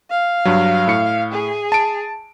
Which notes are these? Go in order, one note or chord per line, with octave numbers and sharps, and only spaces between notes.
F5
G2 F#3
A2 C#7
G#4
A5 D7